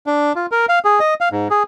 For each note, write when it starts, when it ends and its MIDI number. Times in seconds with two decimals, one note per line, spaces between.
0.06 0.33 62
0.36 0.46 65
0.52 0.66 70
0.69 0.79 77
0.85 0.99 68
1.00 1.14 75
1.21 1.29 77
1.32 1.48 44
1.51 1.63 68